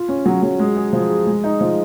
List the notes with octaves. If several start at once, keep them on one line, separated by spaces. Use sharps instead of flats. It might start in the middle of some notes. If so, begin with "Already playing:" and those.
Already playing: F4
C#4
F#3
F#3
G#3
G#4
F3
G#4
G#3
D#4
F3